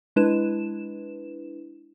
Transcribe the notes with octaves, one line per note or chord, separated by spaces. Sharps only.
G#3 D4 E4 B4 E7